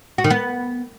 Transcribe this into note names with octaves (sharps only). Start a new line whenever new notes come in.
F#4
D#3
B3